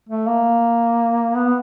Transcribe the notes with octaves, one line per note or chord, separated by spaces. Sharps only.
A3
A#3
B3